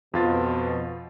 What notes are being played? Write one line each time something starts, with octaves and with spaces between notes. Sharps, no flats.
F2 B2 F4 A6